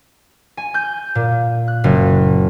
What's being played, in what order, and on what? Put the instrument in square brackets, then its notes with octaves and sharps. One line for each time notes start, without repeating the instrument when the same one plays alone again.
[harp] G#5
G6
A#2
F#6
F#1